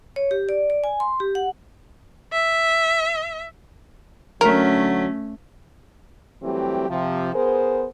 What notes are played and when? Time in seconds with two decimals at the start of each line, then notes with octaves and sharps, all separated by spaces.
0.16 C#5
0.31 G4
0.49 D5
0.70 D5
0.84 G#5
1.00 C6
1.20 G4
1.35 F#5
2.32 E5
4.41 D2 D3 F#3 A3 C#4 A#4
6.42 E3 F#3 G3 A3 C4 G4
6.89 C3 F3
7.34 B3 G#4 A#4 C5